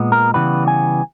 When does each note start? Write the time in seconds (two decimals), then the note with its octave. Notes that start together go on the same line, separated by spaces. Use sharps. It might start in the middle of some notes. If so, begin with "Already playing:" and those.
Already playing: A#2 G#3 B3
0.12 A#4
0.34 C#3 E3 G3 B3 B4
0.68 G#5